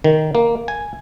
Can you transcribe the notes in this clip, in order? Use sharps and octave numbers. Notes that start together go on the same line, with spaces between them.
D#3
A#3
G#5